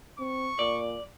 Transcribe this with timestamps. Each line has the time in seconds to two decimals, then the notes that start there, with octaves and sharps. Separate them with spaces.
0.19 C4 C#6
0.59 A#2 D5